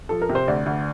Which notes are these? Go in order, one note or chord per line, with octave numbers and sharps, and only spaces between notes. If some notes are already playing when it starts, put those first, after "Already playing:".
F3 A4
A#4
C3
C5
D2 D5
D2